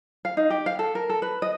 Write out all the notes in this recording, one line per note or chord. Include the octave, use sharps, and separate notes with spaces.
F5
D#4
G4
F5
A4
A#4
A4
B4
D#5